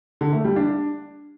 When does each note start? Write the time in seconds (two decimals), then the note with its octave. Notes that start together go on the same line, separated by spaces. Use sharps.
0.21 D3
0.33 A3
0.44 G3
0.56 D4